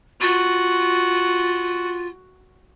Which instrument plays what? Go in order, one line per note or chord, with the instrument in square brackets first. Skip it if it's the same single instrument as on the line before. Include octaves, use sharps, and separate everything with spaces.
[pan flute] F4 [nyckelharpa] F#4